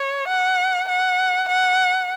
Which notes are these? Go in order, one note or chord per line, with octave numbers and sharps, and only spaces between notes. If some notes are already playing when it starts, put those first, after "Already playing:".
Already playing: C#5
F#5
F#5
F#5